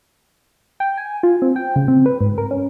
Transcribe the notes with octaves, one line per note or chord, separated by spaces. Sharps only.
G5
G#5
F4
C4
G5
C#3
C4
B4
G#2
A#4
C#4